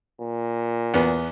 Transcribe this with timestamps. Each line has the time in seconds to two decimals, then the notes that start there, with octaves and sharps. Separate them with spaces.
0.21 A#2
0.94 E2 B3